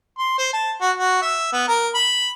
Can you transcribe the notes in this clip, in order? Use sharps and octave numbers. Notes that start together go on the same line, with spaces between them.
C6
C5
A5
F#4
F#4
E5
B3
A#4
B5